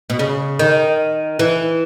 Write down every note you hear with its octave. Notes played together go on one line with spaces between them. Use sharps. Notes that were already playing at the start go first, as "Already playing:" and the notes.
B2
C#3
D#3
E3